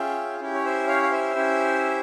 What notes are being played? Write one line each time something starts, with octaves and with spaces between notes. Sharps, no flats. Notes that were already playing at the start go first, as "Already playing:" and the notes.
Already playing: C#4 F4 G#4 E5 G5
C#4 E4 G4
C#5
C5 E5
C#5 F5
F5
C5 E5
C#4 E4 G4